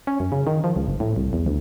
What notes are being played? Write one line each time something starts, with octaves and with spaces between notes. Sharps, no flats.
C#4
F#2
C#3
D#3
F3
C#2
F#1
A2
C2
E2
D2